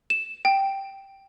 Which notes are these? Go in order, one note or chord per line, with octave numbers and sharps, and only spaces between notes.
E7
G5